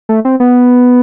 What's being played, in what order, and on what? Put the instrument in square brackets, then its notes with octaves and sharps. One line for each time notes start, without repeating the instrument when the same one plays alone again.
[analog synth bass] A3
C4
B3